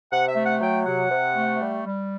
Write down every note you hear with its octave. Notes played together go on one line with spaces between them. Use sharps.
C3 F#5
E5
A3
F#5
F#3 G5
C3 F#5
C3
A3
G3
G3